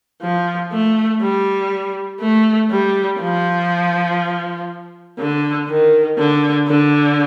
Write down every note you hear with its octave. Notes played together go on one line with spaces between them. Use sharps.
F3
A3
G3
A3
G3
F3
D3
D#3
D3
D3